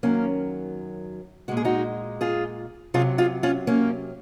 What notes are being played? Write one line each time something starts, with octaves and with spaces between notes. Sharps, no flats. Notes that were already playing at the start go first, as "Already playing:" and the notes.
F#2 D#3 F#3 A#3 C#4
A#2 G#3 F#4
G#4
D#4 F#4
F4 G#4
C3 F#3 F4 G#4
F4 G#4
C#4 F4
A#3 C#4